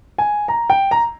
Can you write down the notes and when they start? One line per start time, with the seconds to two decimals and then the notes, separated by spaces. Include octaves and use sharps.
0.18 G#5
0.48 A#5
0.70 G5
0.91 A#5